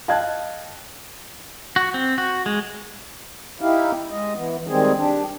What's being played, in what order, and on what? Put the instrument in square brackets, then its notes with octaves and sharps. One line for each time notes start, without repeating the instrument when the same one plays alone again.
[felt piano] D#5 F5 G5 A5 F#6 G#6
[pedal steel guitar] F#4
C4
F#4
G#3
[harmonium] D#4 E4 G4 F5
G#3 D#5
E3 B3
D#3 G3 G#3 C4 G#4
D4 G4